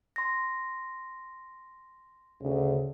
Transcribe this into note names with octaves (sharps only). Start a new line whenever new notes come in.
C6 A#6
D2 C#3